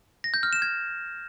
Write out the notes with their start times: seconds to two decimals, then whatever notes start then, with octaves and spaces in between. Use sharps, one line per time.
0.24 A#6
0.34 G6
0.43 F6
0.53 E7
0.62 G#6